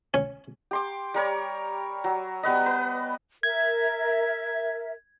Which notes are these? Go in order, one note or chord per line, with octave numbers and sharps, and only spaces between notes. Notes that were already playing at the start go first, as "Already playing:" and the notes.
C#4
G4 C6 D6
G3 A#4 C#5
F#3
G3 B3 B4 D#5
B4
A#4 E5 G#6